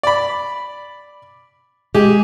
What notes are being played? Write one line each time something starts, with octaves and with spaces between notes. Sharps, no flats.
D5 B5
G#3 G4 G#4